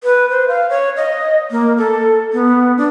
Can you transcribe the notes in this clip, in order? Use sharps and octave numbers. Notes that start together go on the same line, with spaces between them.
B4
C5
F5
C#5
D#5
A#3
A4
B3
D4